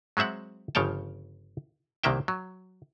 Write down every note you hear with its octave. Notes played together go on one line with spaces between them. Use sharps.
F#3 G#3 C4 E5 F#5
G1 C#3 F3 C#5 G5 A5
C2 C3 D#3 A#3 E5 G5
F#3